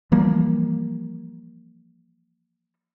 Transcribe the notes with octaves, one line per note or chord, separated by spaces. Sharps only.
E3 F3 G3 A#3